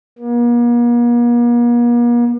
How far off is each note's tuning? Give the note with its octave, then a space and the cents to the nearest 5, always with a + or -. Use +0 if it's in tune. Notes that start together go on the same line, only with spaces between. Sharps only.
A#3 +45